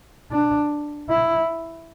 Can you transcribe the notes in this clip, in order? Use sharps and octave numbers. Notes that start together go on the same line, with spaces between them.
D4
E4